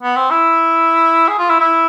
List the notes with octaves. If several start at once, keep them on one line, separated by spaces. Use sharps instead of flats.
B3
C4
E4
G#4
F4
E4
E4